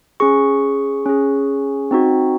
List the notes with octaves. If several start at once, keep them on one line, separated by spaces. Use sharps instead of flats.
C#4 G#4 C#6
C#4 G#4
C4 D#4 F#4